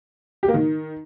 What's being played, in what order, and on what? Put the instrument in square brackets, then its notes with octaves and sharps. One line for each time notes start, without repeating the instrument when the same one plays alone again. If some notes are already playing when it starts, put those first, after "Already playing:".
[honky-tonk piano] G4
A#3
D#3